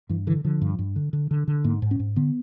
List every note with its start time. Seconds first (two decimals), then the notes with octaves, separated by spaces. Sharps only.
0.09 G2 E3
0.27 D3 E3
0.44 D3 F3
0.62 G2
0.79 G2
0.96 D3
1.13 D3
1.31 D3
1.48 D3
1.64 G#2 A#3
1.82 G#2
1.91 C#4
1.99 G#2
2.16 D3 B3